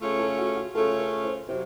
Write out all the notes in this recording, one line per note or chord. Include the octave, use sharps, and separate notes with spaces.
C#3 A3 C#4 F4
A4
F#4
F#4
C#3 A3 C#4 F4 A4
A#4
C5
C3 F#3 C5